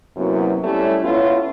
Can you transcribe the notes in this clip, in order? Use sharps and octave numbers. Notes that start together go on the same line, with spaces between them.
F#2 C3 F#3 A#3 B3 E4
G3 A3 C#4 E4 G4 C#5
B3 C#4 E4 F4 C#5